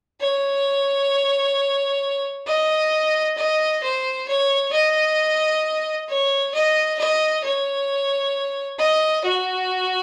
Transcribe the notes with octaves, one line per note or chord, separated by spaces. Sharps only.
C#5
D#5
D#5
C5
C#5
D#5
C#5
D#5
D#5
C#5
D#5
F#4